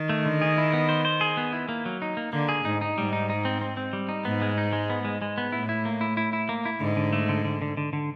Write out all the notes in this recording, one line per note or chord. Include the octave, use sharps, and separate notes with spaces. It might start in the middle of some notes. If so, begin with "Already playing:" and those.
Already playing: D#3
A3
D3
G#4
E4
B3
C5
C5
G#4
B3
E4
A#3
F#3
D#4
A#3
D3 A#3
G#4
G#2 D#4
D#4
G#2 G3
D#4
D#4
C4
C4
C4
G3
D#4
G#2 B3
G#3
D#4
G#3
B3
G#3
G#3
B3
A2 E4
E4
A#3
E4
E4
E4
A#3
E4
G#2 D3
D3
A3
D3
D3
D3
D3
D3